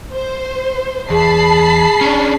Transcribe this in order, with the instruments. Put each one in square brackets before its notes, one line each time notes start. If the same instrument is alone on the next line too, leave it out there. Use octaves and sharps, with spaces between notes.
[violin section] C5
[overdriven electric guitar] E2 [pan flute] G#4 [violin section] A5 B5 C7
[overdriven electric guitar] C#4 D4